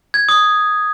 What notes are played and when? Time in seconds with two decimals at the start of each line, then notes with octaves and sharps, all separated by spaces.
0.14 G#6
0.29 D#6